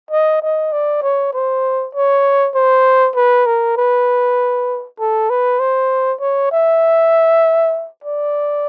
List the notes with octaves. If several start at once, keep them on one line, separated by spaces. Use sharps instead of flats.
D#5
D#5
D5
C#5
C5
C#5
C5
B4
A#4
B4
A4
B4
C5
C#5
E5
D5